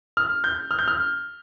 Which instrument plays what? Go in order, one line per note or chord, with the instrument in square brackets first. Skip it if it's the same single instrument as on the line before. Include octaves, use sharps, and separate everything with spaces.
[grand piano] F6
G6
F6
G6
F6